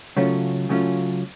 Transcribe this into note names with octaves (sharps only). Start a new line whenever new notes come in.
C#3 F#3 A3 C#4 F4
C#3 F#3 A3 C#4 F4